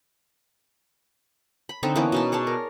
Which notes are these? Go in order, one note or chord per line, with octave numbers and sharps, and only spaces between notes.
B5
D3 C4 D#4 A4
E3 A#3 B3 C#4
B2 D#4 A5
G#4 C#5 D5 A5
A#4